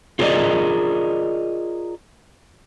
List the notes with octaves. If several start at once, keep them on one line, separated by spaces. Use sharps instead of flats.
F4 G#4 A#4 B4 D5 D#5